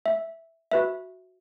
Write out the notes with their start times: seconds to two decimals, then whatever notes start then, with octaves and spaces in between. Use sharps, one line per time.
0.06 E5
0.71 F#4 B4 E5